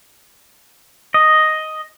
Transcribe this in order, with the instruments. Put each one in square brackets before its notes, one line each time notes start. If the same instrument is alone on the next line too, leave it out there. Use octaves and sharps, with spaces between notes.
[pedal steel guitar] D#5